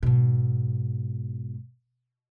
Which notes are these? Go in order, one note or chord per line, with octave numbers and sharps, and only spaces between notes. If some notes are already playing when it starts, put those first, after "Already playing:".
G#2 B2